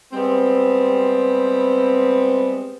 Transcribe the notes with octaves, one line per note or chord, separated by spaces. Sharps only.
G3 G#3 B3 C4